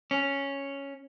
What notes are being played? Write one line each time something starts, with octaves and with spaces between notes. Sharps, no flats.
C#4